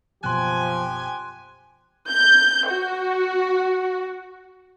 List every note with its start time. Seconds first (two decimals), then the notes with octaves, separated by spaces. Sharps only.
0.24 F#1 B2 F3 G4 G5 G#5 C6 F#6
2.10 G6
2.71 F#4